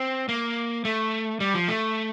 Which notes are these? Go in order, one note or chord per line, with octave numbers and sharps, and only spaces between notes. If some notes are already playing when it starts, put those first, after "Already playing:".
Already playing: C4
A#3
A3
G3
F3
A3